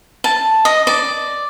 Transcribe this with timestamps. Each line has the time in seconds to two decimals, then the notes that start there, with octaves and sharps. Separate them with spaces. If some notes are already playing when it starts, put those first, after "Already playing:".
0.24 A5
0.65 D#5
0.87 D5